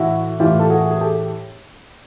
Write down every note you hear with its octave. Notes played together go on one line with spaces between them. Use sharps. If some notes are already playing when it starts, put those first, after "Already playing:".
Already playing: A2 E3 E4 F#4
A2 E3 F4 G4
A4
F#4 G#4
G#4
G4 A4